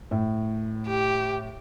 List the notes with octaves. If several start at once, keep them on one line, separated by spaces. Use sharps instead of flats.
A2
G4